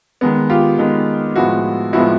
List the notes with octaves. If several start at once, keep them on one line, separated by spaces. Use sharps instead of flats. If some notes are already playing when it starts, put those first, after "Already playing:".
D#3 G#3 B3
F4 G4
D#3 G#3 B3
A2 F3 G#3 B3 E4 F#4
A2 F3 G#3 B3 E4 F#4